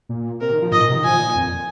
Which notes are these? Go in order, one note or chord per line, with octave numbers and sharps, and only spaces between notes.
A#2
C3 A#4
D#3
F3
G#2 D#5
A#2
C3
D#3
F3 G#5
A#2
F2